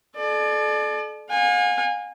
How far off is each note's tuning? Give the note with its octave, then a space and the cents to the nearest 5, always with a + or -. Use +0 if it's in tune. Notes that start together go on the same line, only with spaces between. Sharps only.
A4 -40 D5 +30
F5 +45 G#5 -25